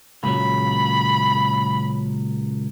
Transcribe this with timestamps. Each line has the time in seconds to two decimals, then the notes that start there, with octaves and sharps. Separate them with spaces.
0.24 C#2 A#2 F#3 B5